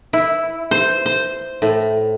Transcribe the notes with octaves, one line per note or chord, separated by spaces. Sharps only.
E4
C5
C5
A2